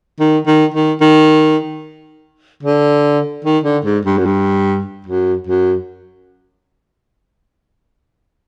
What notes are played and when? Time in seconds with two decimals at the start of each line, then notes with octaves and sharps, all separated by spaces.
0.20 D#3
0.46 D#3
0.74 D#3
1.01 D#3
2.63 D3
3.44 D#3
3.64 D3
3.85 G#2
4.05 G2
4.18 F#2
4.25 G2
5.06 F#2
5.47 F#2